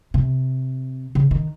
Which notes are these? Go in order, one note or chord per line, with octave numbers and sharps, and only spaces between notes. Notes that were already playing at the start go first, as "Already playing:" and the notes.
C3
C#3
D#3